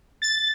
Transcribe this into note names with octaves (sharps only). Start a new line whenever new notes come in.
A6